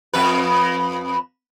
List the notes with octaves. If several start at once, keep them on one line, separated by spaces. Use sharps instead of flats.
F2 B4